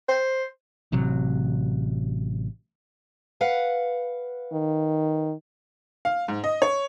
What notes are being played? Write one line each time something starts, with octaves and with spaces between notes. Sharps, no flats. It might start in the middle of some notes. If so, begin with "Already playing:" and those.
C5
A1 C3 F#3
B4 F5 F#5
D#3
F5
G#2
D#5
C#5